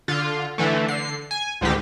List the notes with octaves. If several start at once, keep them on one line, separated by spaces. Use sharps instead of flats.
D3 F4
D3 E3 A3
D3 C7
G#5
C#2 G#2 D3 D#3 G4